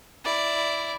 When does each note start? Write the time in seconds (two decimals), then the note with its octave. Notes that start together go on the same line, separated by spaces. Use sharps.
0.24 E4 D5